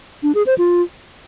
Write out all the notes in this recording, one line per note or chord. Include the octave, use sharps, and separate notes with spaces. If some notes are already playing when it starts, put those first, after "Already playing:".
D4
G#4
C5
F4